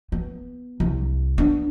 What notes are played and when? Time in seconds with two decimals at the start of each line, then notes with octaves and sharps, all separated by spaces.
0.12 B3
0.80 C2
1.38 B3 D4